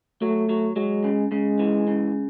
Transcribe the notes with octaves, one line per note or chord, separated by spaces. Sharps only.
F#3 A3
F#3
F#3 G#3
C#3
C#3 G#3
E3
C#3